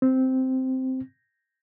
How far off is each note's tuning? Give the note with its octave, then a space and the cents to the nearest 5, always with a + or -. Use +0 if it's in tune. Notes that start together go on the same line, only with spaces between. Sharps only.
C4 -5